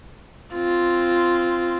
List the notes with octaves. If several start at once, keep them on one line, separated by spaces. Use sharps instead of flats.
C4 F4